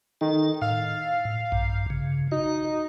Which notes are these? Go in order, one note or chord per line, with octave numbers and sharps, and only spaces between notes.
D#3 A4
A2 F5
A#1 G2
C#3
D#4 F#4